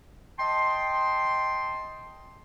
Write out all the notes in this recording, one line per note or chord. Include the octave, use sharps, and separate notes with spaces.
D#5 G5 A5 C6